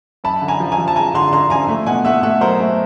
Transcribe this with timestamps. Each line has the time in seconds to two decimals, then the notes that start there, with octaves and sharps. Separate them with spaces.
0.24 F#2 A5 B5
0.42 D3
0.48 G#5 A#5
0.60 F3
0.72 G#5 A#5
0.78 F3
0.88 A5
0.96 G#3 G#5 A#5
1.14 D3 A#5 C6
1.33 D3 A#5 C6
1.50 F3 G#5 A#5
1.69 A3
1.86 B2 F#5 G#5
2.05 A3 E5 F#5
2.23 A3 E5 F#5
2.41 F#3 A#4 C5
2.60 A3